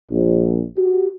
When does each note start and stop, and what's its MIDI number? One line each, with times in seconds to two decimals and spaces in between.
0.10 0.62 34
0.76 1.07 66
0.76 1.07 67